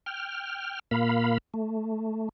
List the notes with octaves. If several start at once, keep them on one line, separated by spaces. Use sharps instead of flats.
G5 F6
A#2 A#3 F5 B5
A3